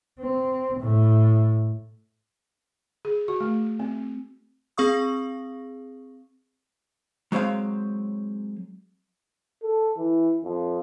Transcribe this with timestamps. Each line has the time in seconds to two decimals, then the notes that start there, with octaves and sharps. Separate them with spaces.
0.20 C4
0.80 A2
3.05 G#4
3.28 F#4
3.40 A3
3.79 C4
4.78 C4 G#4 F5 C#6 D#6
7.32 F#3 G#3 C4 C#5 F5
9.63 A4
9.97 E3
10.44 F2